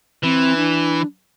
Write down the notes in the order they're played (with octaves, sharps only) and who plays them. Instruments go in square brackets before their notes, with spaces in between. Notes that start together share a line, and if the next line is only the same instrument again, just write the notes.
[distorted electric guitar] E3 [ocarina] C4
[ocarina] D4